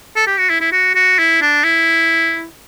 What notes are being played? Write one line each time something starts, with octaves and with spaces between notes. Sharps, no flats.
A4
G4
F#4
E4
E4
F#4
F#4
E4
D4
E4